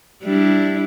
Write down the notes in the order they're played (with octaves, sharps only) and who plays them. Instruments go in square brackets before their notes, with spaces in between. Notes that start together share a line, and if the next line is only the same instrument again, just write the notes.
[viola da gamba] G3 D4 E4